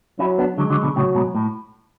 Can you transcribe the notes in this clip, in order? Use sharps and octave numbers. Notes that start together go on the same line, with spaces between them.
F#3 C#4 E4
B3 D4
D3 F#3 G#3
D3 F#3
B2 D3
A2 C#3 F#3
G#2 B2
A2